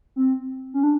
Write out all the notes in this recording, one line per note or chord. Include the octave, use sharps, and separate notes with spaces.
C4
C#4
D4